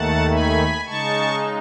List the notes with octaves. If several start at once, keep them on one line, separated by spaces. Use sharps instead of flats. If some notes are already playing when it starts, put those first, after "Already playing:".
Already playing: D#2 D#3 A3 F#5 A5
G#5 B5
C#3 G#3 D#4 A5 C#6